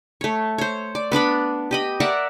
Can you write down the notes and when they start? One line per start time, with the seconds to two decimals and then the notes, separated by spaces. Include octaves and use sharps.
0.21 A3 C#5
0.58 C5 C#5
0.95 D5
1.12 B3 D4 D5 B5
1.71 G4 D#5 B5
2.00 A#4 D5 E5 F#5